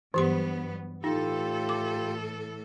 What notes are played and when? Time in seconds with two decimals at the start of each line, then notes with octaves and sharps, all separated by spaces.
0.14 G2 E3 F#3 B3 G4 C6
1.04 A2 E3 D#4 F4 G4 A4
1.69 D6